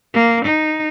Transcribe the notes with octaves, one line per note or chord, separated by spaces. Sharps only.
A#3
D#4